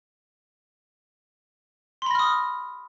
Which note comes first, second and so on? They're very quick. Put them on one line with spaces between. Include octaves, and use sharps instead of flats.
C6 B5 A#6 F6 D#6